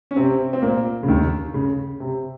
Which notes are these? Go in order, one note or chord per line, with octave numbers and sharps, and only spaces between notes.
C#4
C3 C4
C4
A#2 A#3
C#3
D#2 D#3
C#3
C3